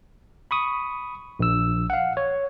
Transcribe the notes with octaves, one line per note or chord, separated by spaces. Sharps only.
B5 C#6 D#6
A#1 E6
F5 F#5
C#5